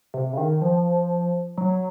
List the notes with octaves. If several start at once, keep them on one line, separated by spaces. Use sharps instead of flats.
C3
C#3
D#3
F3
F#3